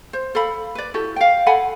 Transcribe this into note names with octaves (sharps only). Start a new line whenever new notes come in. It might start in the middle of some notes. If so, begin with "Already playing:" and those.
C5
A4 F5 B5
B4 D5
E4 F#4 G4 A4
F5 G5
A4 F#5 G#5 B5